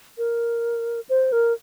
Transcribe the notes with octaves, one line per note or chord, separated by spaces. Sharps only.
A#4
C5
A#4